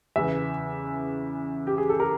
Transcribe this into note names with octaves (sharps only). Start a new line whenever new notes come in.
E2 C#3 E3 E5
G4
G#4
A4
A#4